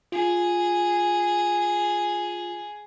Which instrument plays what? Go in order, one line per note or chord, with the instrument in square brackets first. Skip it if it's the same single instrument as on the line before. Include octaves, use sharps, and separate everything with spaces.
[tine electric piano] F4 [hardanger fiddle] G#4